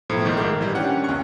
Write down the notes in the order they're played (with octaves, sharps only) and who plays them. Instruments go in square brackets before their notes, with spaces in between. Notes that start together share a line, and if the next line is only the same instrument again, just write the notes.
[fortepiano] B1 [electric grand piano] A2 F3
[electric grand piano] A#1 G#2 D#3
[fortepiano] A#4
[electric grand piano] E3 G3
[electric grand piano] C#4 D4 F#5 [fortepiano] G4
[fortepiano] C#2 C#6